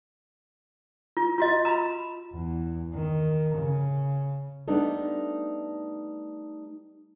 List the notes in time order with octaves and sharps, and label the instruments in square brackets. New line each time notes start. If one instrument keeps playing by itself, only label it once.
[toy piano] F4
F4 F#4 D#5
A#5 B5
[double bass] E2
D#3
C#3
[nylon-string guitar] G3 A3 B3 D4 D#4 A4